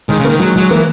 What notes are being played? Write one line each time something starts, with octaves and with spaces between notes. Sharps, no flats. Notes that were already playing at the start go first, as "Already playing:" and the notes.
D#3 G#3
C#3
D#3 A#3
F#3 G#3
F#3 G#3
E3 A#3